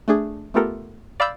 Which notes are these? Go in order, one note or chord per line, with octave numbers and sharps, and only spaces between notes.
A3 D4 G#4
A3 B3 F4 G4 A4 A#4
D5 F5 B5 D6 E6 G6